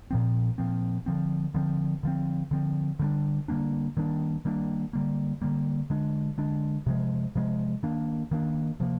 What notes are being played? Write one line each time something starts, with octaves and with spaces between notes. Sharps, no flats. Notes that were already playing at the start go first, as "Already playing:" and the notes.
A#2 F3 C4
A#2 F3 C4
D3 F3 C4
D3 F3 C4
D3 F3 C4
D3 F3 C4
D3 G3 A#3 D4
D3 G3 A#3 D4
D#3 G3 A#3 D4
D#3 G3 A#3 D4
D3 G3 A#3
D3 G3 A#3
D3 G#3 D4
D3 G#3 D4
C3 F3 G#3
C3 F3 G#3
D#3 A#3 D4
D#3 A#3 D4
C3 F3 A#3